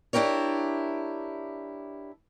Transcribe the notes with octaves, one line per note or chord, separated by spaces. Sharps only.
D4 E4 G4 A#4 C#5